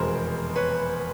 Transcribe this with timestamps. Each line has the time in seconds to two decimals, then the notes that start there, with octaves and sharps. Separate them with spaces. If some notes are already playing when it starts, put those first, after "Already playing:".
Already playing: F1 E2 B2 G#3 A#4 C5
0.55 B4 C#5